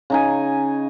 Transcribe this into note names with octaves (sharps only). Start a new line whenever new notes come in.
C#3 D#4 G#5